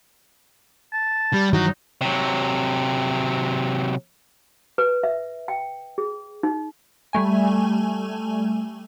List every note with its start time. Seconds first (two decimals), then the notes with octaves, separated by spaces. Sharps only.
0.93 A5
1.33 G3
1.53 G2 D#3 E3 F#3 D#4 F#4
2.01 C3 F#3
4.78 B4
5.03 E5
5.48 G5
5.98 G#4
6.43 D#4
7.13 G3 A3 G#5